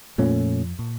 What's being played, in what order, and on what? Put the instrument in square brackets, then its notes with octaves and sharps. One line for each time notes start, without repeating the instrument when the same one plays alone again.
[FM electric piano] F2 F3 [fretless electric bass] A#2 A3 C#4
[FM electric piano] A#2